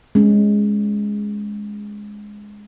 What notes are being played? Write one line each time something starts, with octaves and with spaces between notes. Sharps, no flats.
G#3 C#4